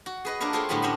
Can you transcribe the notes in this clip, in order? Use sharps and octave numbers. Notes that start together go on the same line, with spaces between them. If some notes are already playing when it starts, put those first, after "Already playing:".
F#4
G#4 B4 D#5
A#3 D4 A#4 B4 C#5
F4 G#4 A4 C5 C#5 G5
A2 D3 F#3 G3 B3 E4
C#4 D4 C5 D#5 B5